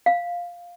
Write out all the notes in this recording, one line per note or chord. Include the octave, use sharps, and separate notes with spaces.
F5